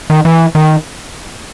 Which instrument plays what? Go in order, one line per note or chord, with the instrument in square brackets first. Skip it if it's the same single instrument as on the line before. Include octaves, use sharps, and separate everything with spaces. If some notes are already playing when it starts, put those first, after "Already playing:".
[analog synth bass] D#3
E3
D#3